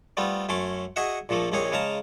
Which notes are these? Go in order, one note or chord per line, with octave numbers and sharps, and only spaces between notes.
G3 A3 B3 C4 F4
F#2 A3 C#4 C6 D6
F#4 G#4 D#5 E5 F#5
A#1 A#2 F3 A3 A#3
A#1 D#2 A#3 C4 G#4 C#5
C#3 G#3 F5 A5 A#5